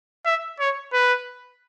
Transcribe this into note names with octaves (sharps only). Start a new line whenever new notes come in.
E5
C#5
B4